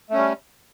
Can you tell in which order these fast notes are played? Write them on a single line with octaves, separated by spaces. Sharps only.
A3 C#4 G3